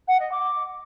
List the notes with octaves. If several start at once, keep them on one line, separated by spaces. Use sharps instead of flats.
F#5
D#5
D6